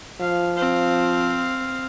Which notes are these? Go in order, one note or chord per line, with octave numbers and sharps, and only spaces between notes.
F3 F5
C4 F5